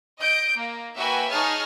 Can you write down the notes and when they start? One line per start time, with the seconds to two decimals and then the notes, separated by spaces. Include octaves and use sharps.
0.19 D#5 G6 D7
0.56 A#3
0.96 A#3 F#4 B4 E5 G5 G#5
1.30 D#4 G#4 C#5 A5 F6